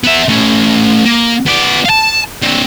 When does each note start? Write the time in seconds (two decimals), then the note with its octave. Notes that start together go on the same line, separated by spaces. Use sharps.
0.04 B3 E5
0.29 A3 C#4
1.05 A#3
1.47 B3 D5
1.85 F5 A5
2.42 C4 D4